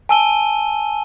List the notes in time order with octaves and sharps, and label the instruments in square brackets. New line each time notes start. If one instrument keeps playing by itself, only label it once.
[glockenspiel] G#5 A5 E6 D#7 G7